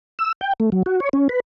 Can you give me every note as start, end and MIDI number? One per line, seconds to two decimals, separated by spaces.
0.19 0.32 88
0.41 0.53 79
0.60 0.70 57
0.72 0.83 54
0.86 1.00 66
1.00 1.09 73
1.13 1.28 61
1.29 1.40 71